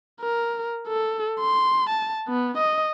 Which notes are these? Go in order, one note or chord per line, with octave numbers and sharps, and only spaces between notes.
A#4
A4
C6
A5
B3
D#5